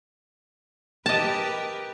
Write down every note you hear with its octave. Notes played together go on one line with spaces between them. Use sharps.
G4 A#4 B4 D#5 A5